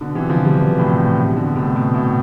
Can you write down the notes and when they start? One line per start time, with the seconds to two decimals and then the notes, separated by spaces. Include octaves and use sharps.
0.01 B2 D3
0.15 C3 E3
0.30 D3 F3
0.45 E3 G3
0.59 E3 G3
0.78 A2 C3
0.97 A2
1.17 B2
1.37 B2 D3
1.55 A2 C3
1.76 B2
1.95 A2